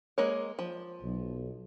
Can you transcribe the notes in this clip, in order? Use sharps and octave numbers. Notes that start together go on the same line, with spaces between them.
G#3 A#3 C#5
F3
B1